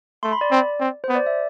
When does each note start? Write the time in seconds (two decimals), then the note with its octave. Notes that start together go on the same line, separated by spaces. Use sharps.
0.23 A3 C6
0.32 B5
0.41 D5
0.51 C4
0.80 C4
1.04 C5
1.09 B3
1.15 D5
1.26 E5